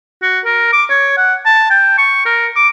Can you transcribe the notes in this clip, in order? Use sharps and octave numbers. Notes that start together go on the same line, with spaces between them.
F#4
A#4
D6
C#5
F#5
A5
G5
C#6
A#4
D6